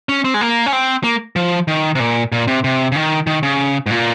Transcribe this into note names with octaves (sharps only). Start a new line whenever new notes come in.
C#4
C4
G#3
A#3
C#4
C4
A#3
F3
D#3
C3
A#2
A#2
C3
C3
C#3
D#3
D#3
C#3
G#2
A#2